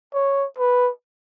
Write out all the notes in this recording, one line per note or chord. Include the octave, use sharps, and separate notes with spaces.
C#5
B4